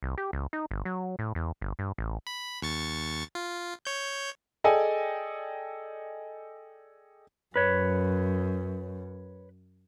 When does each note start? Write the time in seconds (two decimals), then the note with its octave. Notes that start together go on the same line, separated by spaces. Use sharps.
0.03 C2
0.18 G4
0.33 C#2
0.53 D#4
0.71 G1
0.85 F#3
1.19 A2
1.35 E2
1.61 G1
1.79 G2
1.98 A1
2.27 B5
2.62 D#2 C#6 A6
3.35 F4
3.85 C#5 G6
4.64 G#4 A4 D5 D#5 G5 G#5
7.56 F#2 B4 C#5